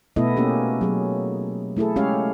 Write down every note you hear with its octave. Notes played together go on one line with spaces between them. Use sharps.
B2 A3 B3 E4 A4 D#5
A#3 C#4 G4
F#3 G#4
A3 E4 G#4 A4
G#3 C#4 G4 G#4 C#5 F5